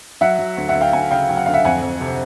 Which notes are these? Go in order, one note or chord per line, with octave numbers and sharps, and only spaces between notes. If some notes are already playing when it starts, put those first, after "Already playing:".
F#3 E5 F#5
F#3
D2
E5 F#5
D2
F5 G5
D2 F#5 G#5
C#3 F5 G5
F#3 G5
F#5
D2 F5
E5 F#5
F2 F#5 G#5
F2
C3